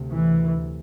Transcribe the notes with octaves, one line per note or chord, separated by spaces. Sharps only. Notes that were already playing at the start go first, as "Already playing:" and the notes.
Already playing: D2 C3
E3